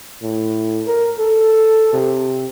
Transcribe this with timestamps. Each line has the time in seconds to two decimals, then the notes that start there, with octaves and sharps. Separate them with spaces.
0.23 A2
0.87 A#4
1.19 A4
1.93 C3